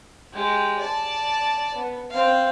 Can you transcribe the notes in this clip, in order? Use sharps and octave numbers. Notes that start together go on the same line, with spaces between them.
G#3 G4
D5 A5
B3
C4 F5